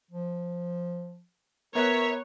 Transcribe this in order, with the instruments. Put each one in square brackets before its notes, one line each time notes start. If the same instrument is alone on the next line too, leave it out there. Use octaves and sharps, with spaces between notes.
[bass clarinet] F3
[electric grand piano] B3 B4 F#6 [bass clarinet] A#4 [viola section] C#5 [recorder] E5